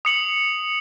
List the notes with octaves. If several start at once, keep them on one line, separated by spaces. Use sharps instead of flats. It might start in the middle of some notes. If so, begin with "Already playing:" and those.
D#6 C#7 F#7